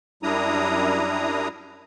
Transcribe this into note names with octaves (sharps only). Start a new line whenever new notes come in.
F#2 G3 D4 E4 A#5 D#6